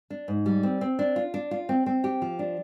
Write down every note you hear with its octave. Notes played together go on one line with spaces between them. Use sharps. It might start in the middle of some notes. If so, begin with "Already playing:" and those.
D4
G#2
G3
C4
C4
D4
F4
D4
F4
C4
C4
G4
F3
D4